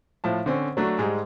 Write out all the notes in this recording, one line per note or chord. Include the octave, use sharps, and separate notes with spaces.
A2 F3 A5
D3 C4 C#4
F#3 A3 D4 F#4
G#2 G3 G#3